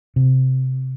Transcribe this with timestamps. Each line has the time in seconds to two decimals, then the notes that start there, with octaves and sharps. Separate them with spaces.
0.16 C3